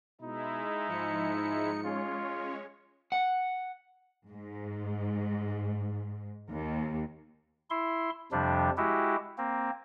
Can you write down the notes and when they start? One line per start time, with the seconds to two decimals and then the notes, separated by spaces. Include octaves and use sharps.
0.21 B2 G#3 D#4 E4
0.88 G#2 F3 C#7
1.83 G#3 C#4 F4 C#5
3.12 F#5
4.27 G#2
6.49 D#2
7.70 E4 C6
8.32 F2 C3 F3 G3 D4
8.77 G#3 E4 F#4 G4
9.38 A#3 C4